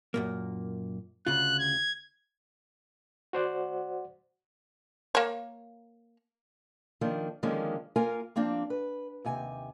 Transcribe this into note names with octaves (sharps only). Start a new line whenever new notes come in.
F#2 A#2 A#3
D2 C#3 F4 F#6
G#6
F#4 C5 D5 F#5
A#3 C#5
D#3 F3 A#3 D4
D3 D#3 F3 G#3 A#3 C#4
A#3 F4 A#4 F5 G#5
F3 A#3 C4 D4
B4
D#2 C3 G#5